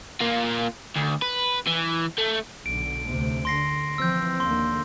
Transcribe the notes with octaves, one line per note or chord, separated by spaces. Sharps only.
A#3 F4
D2
B4
E3
A3
B1 D3 D7
D2 C3
D3 C6 A#6 C7
E3 F3 C4 E6 G6
D#2 D3 A#3 C6